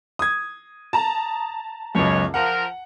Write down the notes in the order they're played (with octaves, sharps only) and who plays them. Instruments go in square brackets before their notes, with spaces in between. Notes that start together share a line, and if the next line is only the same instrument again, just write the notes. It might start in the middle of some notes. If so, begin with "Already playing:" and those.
[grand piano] D#6 G#6
[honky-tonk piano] A5 A#5
[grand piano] C#2 F#2 [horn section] B2 C#5
[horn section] F3 A#4 [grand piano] F#5